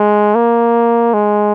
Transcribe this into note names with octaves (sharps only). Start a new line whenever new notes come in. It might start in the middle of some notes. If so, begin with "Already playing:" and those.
Already playing: G#3
A#3
G#3